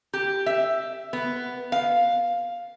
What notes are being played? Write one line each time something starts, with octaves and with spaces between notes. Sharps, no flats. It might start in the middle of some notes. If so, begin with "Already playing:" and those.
G4
E5
B3
F5